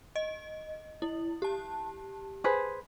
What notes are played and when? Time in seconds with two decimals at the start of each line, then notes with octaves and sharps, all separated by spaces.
0.16 D#5
1.02 E4
1.42 G4 A5
2.44 G#4 B4 C5